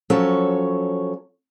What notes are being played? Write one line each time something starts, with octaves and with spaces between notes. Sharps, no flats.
F3 F#3 C#4 A4 C#5